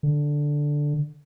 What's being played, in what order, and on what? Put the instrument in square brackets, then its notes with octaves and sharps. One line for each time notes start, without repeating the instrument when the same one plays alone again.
[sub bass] D3